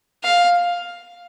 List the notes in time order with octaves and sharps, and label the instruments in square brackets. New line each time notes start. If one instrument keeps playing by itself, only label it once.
[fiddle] F5